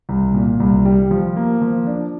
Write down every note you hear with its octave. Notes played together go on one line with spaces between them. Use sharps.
C2
A#2
C2
G3
F3
A#3
F3
D4